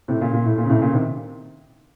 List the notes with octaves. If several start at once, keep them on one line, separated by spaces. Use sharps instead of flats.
A2 C3
A#2 C#3
A#2
A2
A#2
C#3
A2 C3
A#2 C#3
C3 D#3